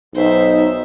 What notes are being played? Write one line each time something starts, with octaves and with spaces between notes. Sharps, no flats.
B1 D#4 C5 E5